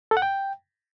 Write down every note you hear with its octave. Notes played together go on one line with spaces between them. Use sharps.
A4
F#5
G5